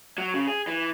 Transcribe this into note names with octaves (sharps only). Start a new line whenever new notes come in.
F#3
C#3
G#4
E3